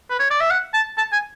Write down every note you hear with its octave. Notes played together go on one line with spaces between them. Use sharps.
B4
C#5
D5
E5
F#5
A5
A5
G#5